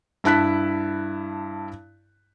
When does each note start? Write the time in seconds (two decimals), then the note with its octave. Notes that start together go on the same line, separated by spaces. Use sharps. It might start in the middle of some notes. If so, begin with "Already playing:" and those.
0.24 G2 E4 A5 F#6 B6